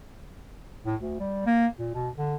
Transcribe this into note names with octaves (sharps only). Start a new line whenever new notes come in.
A2
D2
G3
A#3
A#2
B2
D3